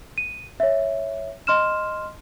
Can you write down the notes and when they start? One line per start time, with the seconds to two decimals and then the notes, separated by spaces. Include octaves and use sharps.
0.18 D#7
0.60 C#5 E5
1.47 D#5 C6 F6 E7